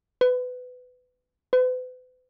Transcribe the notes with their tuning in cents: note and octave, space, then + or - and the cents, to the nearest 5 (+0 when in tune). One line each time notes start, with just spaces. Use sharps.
B4 +20
B4 +40